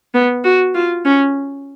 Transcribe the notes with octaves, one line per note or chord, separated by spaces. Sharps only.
B3
F#4
F4
C#4